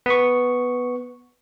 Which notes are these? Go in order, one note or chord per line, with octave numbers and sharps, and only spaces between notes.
B3 C#6